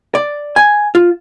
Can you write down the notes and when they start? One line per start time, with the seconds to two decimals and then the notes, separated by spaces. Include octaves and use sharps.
0.15 D5
0.56 G#5
0.95 F4